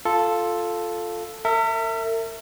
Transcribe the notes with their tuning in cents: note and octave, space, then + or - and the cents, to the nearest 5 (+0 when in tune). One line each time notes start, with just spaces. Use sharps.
F4 +0 A4 +0
A#4 -45 E5 +0